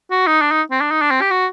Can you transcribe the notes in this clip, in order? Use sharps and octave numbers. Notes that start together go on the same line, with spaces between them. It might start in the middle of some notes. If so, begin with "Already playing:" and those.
F#4
D#4
D4
D#4
C4
D4
D#4
D4
C4
G4
F#4